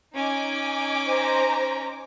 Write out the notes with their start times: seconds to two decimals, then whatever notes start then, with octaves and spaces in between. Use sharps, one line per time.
0.15 C#4 D#4 G#5 D6
1.08 C5 A#5